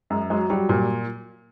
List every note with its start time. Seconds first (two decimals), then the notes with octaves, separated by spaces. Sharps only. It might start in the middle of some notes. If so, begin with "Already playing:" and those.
0.10 F#2 G#3
0.30 F#3 G#3
0.50 F#3 G3
0.69 A#2